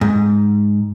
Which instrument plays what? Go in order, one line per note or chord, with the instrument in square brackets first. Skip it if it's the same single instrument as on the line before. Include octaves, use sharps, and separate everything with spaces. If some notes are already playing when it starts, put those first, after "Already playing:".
[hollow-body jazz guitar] G#2